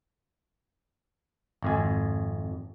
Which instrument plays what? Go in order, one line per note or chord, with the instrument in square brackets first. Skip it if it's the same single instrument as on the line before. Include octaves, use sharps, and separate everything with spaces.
[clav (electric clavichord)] G#1 F2 G#5